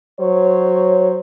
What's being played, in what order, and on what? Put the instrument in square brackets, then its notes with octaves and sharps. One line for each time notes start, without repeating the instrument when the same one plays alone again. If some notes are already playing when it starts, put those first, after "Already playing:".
[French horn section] F#3 C5 C#5